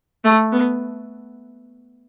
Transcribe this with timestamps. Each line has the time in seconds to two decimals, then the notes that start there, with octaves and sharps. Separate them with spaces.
0.24 A3
0.52 B3